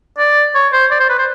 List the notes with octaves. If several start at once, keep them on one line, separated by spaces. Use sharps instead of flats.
D5
C#5
C5
D5
C5
B4
C5